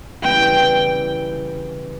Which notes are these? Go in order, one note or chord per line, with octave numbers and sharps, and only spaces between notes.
C#3 E3 G3 B3 G5